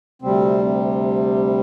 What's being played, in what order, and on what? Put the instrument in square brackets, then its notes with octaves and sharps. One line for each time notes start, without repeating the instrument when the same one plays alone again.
[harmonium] D2 C3 G3 C4